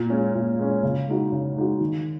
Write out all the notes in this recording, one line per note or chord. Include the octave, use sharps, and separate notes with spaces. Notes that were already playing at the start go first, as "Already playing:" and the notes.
Already playing: A#2
G#3 C#4
A#2
G#3 C#4
C#3
G#3 D#4 F#4
C#3
G#3 D#4 F#4
D#3